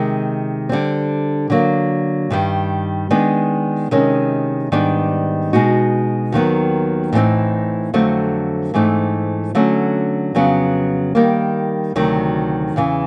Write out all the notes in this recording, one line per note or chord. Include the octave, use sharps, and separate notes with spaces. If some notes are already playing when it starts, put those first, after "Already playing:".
Already playing: C3 D#3 G#3
D3 G3 C4
D3 F#3 A#3
G2 D#3 G3
D#3 G#3 B3 D4
C3 D#3 G#3 C#4
G#2 D#3 G3 B3 D4
B2 G#3 B3 D#4 F#4
D#2 D#3 F#3 B3
A2 E3 G#3 C4 D#4
F2 D3 F#3 A3 C4
G#2 E3 A3 C4 D#4
D3 F#3 A3 C#4
F2 C#3 F#3 B3
D#3 G3 A#3
D2 C3 D#3 F#3
E2 C#3 E3